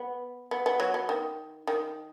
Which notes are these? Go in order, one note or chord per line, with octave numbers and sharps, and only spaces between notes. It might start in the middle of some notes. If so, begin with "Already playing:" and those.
Already playing: B3
B3
B3
F#3
B3
D#3
D#3